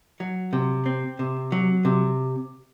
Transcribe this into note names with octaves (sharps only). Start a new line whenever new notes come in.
F#3
C3
C4
C3
F#3
C3